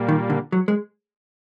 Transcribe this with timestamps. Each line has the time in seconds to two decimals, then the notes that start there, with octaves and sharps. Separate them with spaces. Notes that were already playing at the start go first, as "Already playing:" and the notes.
Already playing: A#2 G3 A#3
0.09 D#3
0.30 D3
0.52 F#3
0.68 G#3